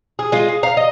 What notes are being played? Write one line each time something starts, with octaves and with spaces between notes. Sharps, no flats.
G#4
G#3 F4
G#4
F5 A#5
D#5